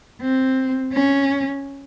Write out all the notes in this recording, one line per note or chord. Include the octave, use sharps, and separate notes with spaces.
C4
C#4